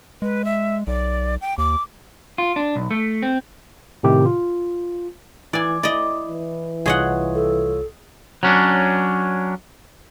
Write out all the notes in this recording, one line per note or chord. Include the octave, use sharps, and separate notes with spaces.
G#3 B4
E5
B1 D5
G5
D#2 D6
F4
D4
B1
A3
C4
A2 C3 D#3 G4
F4
E3 D5 G#5
E4 D5 D#5
E3
C2 F4 G#4 C#5 D#5 F#5
A4
F#3 C#4 D4